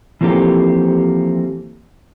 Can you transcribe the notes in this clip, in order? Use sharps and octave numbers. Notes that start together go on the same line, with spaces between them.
E3 F3 A#3 C4 G4 A4